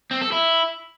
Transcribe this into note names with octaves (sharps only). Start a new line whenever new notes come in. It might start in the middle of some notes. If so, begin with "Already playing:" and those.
C4
A4
E4